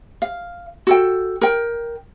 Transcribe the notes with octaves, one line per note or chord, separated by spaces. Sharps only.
F5
F#4 A4 G5
A#4 G5